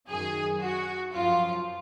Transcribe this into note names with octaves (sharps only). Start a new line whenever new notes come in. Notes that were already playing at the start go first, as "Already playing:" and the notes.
F#2 D#3 F#3 G#4
F#4
F#2 F3 F4